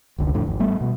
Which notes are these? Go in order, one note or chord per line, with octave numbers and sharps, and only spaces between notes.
F1 C#2 D3
F2 A2 D3
G#1
G3 A3 B3
B2